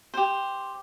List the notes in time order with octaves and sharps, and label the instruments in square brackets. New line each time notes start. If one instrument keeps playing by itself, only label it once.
[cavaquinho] G4 C5